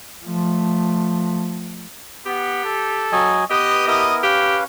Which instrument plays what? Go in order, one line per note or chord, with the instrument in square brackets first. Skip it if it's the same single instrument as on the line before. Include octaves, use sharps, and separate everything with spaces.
[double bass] F3 A3
[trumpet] B3 [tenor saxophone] G4
[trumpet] A4
[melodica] F#3 D#5 G#5
[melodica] B3 B4 [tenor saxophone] G4 [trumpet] D#5
[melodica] B3 E4 A#4 [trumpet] D#5
[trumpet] C#4 [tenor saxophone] G4 [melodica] B4 F5